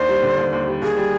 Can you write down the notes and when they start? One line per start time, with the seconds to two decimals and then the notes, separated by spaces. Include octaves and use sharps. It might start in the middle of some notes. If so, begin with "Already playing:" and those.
Already playing: D#2 D4 C5
0.09 G3
0.23 D3
0.38 D#2
0.53 D#2
0.67 G3
0.82 D#2 G#4
0.97 G3